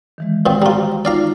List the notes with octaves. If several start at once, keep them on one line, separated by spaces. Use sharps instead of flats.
D#3 E3 G#3
A#2 G#3 C4
G3 F4 F#4 C5 A#5
D#4 F4 D5 F5 A#5